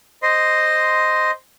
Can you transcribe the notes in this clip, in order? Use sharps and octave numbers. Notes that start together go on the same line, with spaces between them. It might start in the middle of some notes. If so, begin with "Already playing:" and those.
C5 D#5 C6